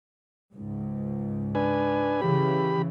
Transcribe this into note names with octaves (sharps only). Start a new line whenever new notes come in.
C#2 G#2
D4 B4 G#5
C#3 E3 G4 B5